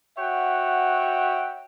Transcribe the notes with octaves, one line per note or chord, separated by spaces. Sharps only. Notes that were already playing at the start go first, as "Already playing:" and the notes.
F#4 C#5 E5 F#5 G5